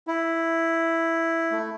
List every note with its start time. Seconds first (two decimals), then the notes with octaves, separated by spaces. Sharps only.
0.07 E4
1.51 A3